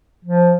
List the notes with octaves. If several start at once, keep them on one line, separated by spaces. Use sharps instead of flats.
F3